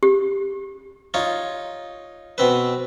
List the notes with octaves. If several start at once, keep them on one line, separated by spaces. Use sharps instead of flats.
G4
D#4 F4 C#5
B2 C4 B4